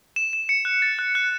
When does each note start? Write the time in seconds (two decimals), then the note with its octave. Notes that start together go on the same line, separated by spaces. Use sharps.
0.16 E7
0.33 E7
0.49 C#7
0.65 F#6
0.82 A6
0.99 F#6
1.15 F#6